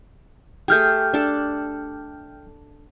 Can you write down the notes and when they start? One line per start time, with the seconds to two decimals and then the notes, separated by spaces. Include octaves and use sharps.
0.68 A3 G4 G#4 G5 F6 G6
1.14 D4 A4